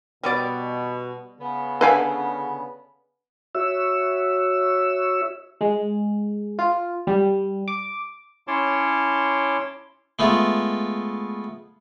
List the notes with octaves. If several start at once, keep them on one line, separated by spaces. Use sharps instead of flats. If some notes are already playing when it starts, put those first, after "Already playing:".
B2 G3 B3 D5
C#3 B3
D3 G#4 B4 F5 G#5 B5
F#4 C#5 E5 E6
G#3
F4
G3
D6
C#4 E4 C#5 A5 C6 D6
G#3 A3 B3 F4